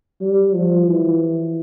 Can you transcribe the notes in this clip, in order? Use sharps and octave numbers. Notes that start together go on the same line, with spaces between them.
G3
F3
E3